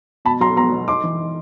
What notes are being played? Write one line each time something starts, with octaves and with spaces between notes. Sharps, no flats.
B2 A5 B5
F#3 A#5 C6
B3 A#5 C6
B2
D#4 C6 D6
E3
D#4